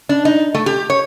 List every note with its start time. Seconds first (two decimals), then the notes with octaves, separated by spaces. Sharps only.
0.09 D4
0.25 D#4
0.55 A3
0.66 G4
0.90 C#5